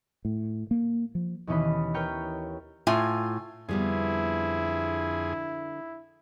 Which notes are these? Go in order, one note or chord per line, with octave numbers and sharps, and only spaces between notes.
A2
A#3
F3
D#2 B2 E3 C#4 D#5 B5
A#4 B4 C#5 G5 C#6 F6
A2 F4 G#5
F2 D3 G3 B3 E4 G#4